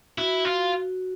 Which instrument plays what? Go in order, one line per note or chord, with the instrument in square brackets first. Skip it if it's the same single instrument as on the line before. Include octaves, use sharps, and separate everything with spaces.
[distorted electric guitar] E4 [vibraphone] F#4
[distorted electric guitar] F4